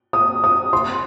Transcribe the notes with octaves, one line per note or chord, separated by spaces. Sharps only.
D#6
D#6
C6